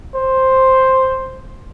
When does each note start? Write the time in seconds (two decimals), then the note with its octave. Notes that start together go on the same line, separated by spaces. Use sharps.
0.15 C5